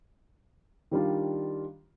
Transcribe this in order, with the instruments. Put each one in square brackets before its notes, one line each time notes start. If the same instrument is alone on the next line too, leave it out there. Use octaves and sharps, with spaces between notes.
[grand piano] D#3 G3 D4 F4